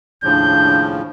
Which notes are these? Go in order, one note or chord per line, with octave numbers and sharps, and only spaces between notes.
D#2 A2 C#3 F3 D4 G6